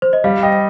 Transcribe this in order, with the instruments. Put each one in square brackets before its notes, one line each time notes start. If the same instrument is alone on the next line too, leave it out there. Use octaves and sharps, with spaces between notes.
[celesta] C5
D#5
[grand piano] G3 [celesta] F5
[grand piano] D#5 [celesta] G5